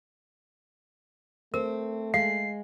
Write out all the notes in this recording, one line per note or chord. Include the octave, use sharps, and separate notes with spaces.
A3 C4 A#4
G#3 F5 C7